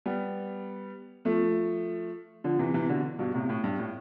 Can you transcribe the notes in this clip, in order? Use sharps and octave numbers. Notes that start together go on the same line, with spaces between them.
G3 B3
F3 A3
D3 F3
C3 E3
C3 E3
B2 D3
G2 B2
A2 C3
A2
G2
A2